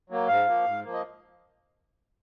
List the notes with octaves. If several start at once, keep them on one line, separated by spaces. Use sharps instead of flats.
F#3 A#3
G#2 F5
F3 A#3
G#2
F3 A#3
D#5